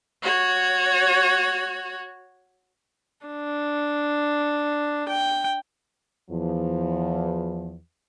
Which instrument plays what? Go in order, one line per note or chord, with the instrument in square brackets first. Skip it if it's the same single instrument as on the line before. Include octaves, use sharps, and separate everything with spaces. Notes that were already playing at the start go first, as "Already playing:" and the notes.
[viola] F#4 C#5
[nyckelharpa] D4
G5
[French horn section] E2 F3